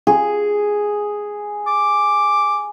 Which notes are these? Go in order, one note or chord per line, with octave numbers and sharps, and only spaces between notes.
G#4
D6